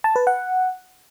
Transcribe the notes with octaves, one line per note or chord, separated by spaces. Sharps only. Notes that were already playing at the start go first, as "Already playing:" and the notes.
A5
B4
F#5